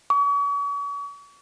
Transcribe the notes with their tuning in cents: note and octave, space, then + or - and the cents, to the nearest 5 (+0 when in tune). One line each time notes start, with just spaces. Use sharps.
C#6 +40